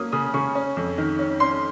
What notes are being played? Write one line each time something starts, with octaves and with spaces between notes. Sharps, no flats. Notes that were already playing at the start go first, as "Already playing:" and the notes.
Already playing: F#3 A#3 C#4 D#6
C#3 D#6
C#3 C#6
C#4
F2
D#3
C#4
C#4 C6